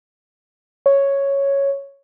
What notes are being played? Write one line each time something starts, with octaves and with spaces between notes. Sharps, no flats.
C#5